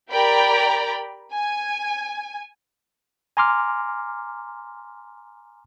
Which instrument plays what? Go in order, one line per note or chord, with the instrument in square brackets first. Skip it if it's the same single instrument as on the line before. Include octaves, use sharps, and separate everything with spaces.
[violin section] G4 A#4 D5 G5 A#5 B5
G#5
[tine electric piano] G#5 A#5 C6 D6 F6